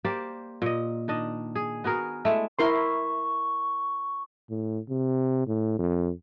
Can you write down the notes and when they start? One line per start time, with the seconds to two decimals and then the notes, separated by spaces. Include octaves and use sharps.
0.04 A#3 G4 C5 D5
0.62 A#2 D#5
1.08 D#3 D4 D#5
1.55 G#4
1.84 B3 F#4 G#4 A#4
2.25 G#3 A3 E4
2.59 E4 A#4 C6 C#6
4.50 A2
4.89 C3
5.47 A2
5.79 F2